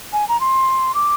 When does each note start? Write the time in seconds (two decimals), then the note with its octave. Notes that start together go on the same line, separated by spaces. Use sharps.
0.13 G#5
0.28 A#5
0.41 C6
0.95 D6